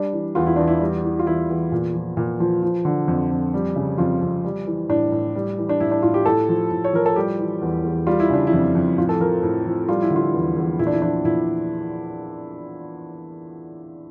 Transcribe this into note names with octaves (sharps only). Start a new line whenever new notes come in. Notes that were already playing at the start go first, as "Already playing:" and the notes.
Already playing: G3 D4
E3
E2 F4
E4
E2 D4
E4
G3
E3
F4
E2 E4
E2
A#2
F3
A#2
F3
F3
D3
F2
F2
G3
C#3
F2 F4
F2
G3
E3
A2 D4
A2
G3
E3
D4
A2 E4
D4
A2 F4
G4
A2 A4
F3
A2
C#5
F3 A#4
A4
G3 G4
E3
E2
E2
G3 F4
E4
C#3 D4
E4
F2
F2
A2 F4
A4
F3 A#4
A2
F3
G3 F4
E4
D3
F4
E2
E2
A#2 E4
D4
E4
F3 D4
A#2 E4